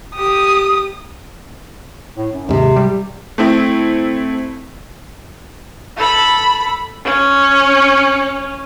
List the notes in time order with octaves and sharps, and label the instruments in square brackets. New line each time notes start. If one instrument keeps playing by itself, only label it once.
[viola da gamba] G4 [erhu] D#6
[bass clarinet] A2
F#2
[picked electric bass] D#2 G#2 [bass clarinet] C3
[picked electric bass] G3
[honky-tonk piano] A3 C4 E4
[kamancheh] A4 B5
C#4